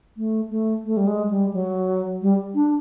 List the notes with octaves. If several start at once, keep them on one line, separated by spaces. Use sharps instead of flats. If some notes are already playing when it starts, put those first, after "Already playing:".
A3
A3
A3
G3
G#3
G3
F#3
G3
D4